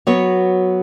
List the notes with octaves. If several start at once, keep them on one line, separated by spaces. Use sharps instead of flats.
F#3 B3 F#4 C#5